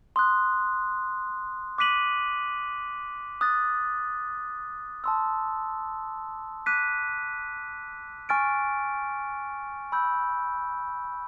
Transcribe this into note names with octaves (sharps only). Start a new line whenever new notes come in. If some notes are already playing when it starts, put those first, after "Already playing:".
C6 D#6 F#6
D6 F#6 B6 D#7 F#7
D#6 F#6 A6
A5 C6 E6
D6 F#6 B6 D#7
G#5 C#6 F6 A6 D7
B5 E6 G6